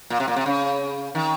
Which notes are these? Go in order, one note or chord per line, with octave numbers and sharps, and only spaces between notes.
A#2
C3
A#2
C3
C#3
D#3